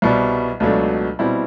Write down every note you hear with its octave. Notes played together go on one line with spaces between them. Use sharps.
C2 B2 G3
C#2 B2 F#3 A3 D4
B2 G3 C4 E4